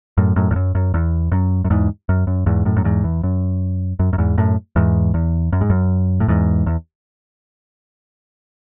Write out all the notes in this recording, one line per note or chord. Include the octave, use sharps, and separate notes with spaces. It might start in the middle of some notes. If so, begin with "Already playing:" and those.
F#2 A2
F#2 A2
E2
F#2
F#2
E2
F#2
F#2
E2 G#2
F#2
F#2
E2 G#2
F#2 A2
F#2
E2 G#2
E2
F#2
F#2
F#2
E2 G#2
F#2 A2
E2 G#2
E2
F#2
G#2
F#2
A2
E2 G#2
E2